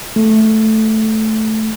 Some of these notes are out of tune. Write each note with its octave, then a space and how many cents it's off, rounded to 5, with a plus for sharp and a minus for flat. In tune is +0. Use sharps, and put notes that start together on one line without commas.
A3 -5